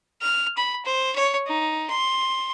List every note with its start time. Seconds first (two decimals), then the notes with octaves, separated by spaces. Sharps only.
0.22 F6
0.57 B5
0.85 C5
1.16 C#5
1.47 D#4
1.90 C6